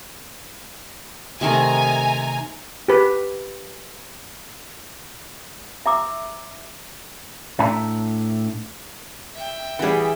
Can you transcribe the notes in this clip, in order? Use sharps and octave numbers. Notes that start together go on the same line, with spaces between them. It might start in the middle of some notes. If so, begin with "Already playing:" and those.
C3 D#3 A3 G#5 A#5
G4 B4
E5 A#5 D6 E6
A2 D4 E5 A#5
E5 G5
E3 G3 B3 G#4